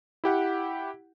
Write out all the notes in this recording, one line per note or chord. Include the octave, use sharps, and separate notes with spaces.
E4 G4 F#5